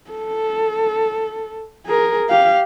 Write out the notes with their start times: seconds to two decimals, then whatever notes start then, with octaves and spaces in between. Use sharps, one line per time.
0.10 A4
1.86 G#4 A#4
2.29 G4 F5